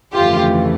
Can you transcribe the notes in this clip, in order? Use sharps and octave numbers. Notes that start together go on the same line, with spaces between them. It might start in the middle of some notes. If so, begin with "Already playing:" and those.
G1 F2 C#3 E3 A3 F4 G4